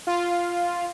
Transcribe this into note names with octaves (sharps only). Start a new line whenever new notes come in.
F4